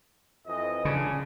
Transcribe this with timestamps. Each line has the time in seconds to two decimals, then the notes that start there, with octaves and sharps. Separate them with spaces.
0.47 F2 E3 D#5
0.85 C#3 D4